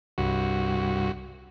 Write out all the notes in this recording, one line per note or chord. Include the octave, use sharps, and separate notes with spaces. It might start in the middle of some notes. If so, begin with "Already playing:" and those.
C2 G2 F#4